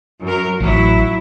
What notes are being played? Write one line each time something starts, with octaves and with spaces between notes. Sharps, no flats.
F#2 F#3 A#4
A1 F#3 E4